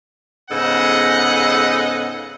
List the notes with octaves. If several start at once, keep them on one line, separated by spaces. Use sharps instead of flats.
G#2 C#3 B3 A4 D#5 F#5